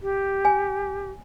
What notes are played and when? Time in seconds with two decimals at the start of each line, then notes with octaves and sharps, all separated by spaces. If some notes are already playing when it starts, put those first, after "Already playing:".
0.01 G4
0.45 G#5